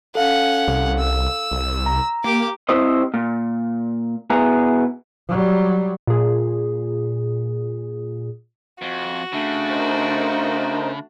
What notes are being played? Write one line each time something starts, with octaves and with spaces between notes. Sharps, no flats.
C#4 A4 F5 F#5
C2
E6
C2
A#5
A#3 G4 D6
C4 E4 G4 C5 D#5
A#2
B2 B3 E4 G#4 A#5
F#3 G3
A#2 G#4
F2 F#4
C#3 A3 D4
D#4 A#4 C5